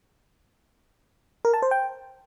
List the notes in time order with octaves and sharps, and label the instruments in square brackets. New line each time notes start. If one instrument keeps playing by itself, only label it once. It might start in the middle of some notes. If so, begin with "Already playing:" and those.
[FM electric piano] A#4
A5
C5
G5